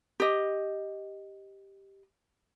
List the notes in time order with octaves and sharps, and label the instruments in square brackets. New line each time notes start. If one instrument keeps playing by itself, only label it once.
[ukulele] G4 D#5